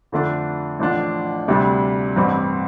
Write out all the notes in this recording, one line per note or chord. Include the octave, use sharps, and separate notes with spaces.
F2 D3 A3 D4
A1 A2 F3 D4
D2 C3 G3 D4
A1 G2 G3 C4